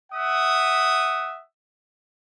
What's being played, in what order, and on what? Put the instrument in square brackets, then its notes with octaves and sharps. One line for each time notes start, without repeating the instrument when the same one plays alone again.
[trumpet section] E5 F#5 D#6